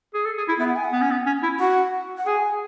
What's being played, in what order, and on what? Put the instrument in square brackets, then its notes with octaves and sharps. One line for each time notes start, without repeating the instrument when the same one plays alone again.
[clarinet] G#4
A4
G#4
E4
[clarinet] B3 [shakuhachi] E5
[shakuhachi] F#5
G#5
F#5
[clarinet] B3
C#4
B3
C#4
E4
[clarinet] F#4 [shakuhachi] F#5
[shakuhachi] F#5
[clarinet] G#4 [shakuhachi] G#5